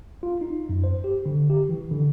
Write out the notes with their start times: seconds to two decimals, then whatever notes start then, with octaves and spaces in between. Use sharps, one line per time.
0.23 F4
0.41 D#4
0.69 F#2
0.84 C5
1.04 G4
1.26 D3
1.50 G4
1.69 E3
1.91 D3